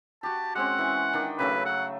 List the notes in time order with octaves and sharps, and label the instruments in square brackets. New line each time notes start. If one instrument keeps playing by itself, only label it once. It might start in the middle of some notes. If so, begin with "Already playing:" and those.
[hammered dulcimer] F#4 G4 [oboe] A5
[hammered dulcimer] G#3 C4 C#4 [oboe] F#5
[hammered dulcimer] E3 C#6
D#3 D4 G5
[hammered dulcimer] C#3 F#3 A3 [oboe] B4
[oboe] F#5